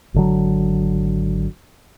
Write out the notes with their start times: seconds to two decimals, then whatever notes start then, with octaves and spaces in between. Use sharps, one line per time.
0.14 G#1 D3 F#3